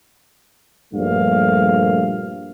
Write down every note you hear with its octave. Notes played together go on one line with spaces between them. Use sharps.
A#1 G2 A3 F5